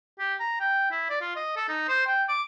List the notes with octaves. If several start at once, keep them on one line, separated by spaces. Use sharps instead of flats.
G4
A#5
G5
E4
D5
F4
D#5
A4
D#4
C5
G5
D6